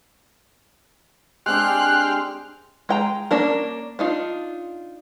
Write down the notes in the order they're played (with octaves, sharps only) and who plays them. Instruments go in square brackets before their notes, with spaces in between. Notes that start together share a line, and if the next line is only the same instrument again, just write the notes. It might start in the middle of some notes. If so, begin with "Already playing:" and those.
[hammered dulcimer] G#3 C4 D4 [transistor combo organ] G4 C6 F6 [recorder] F#6
[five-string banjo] G#3 G5 A#5
A#3 C#4 D4 A#4
D4 D#4 F4